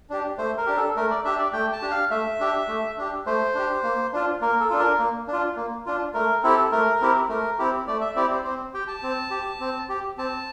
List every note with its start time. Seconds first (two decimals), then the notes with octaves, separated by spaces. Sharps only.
0.10 D4 G4
0.38 A3 C5
0.58 A#4
0.66 D4 G4
0.77 A4
0.96 A3 A#4
1.10 D5
1.25 D4 G4 E5
1.38 D5
1.53 A3 G5
1.73 A5
1.82 D4 G4
1.91 F5
2.11 A3 E5
2.40 D4 G4
2.68 A3
2.98 D4 G4
3.26 A3 C5
3.55 D4 G4
3.83 A#3
4.12 D4 F4
4.41 A#3 A#4
4.60 A4
4.70 D4 F4
4.79 A#4
4.99 A#3
5.28 D4
5.33 F4
5.56 A#3
5.86 D4 F4
6.14 A3 A#4
6.43 C4 E4 G4 A4
6.72 A3 A#4
7.01 C4 E4 G4
7.29 A3 A#4
7.59 C4 E4 G4
7.87 A3 D5
8.01 E5
8.16 C4 E4 G4 D5
8.31 C5
8.44 C4 C5
8.74 G4 G5
8.88 A5
9.03 C4
9.31 G4
9.60 C4
9.89 G4
10.18 C4 A5